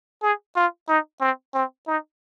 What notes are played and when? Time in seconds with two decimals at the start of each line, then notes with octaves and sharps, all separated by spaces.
0.23 G#4
0.56 F4
0.88 D#4
1.21 C4
1.54 C4
1.87 D#4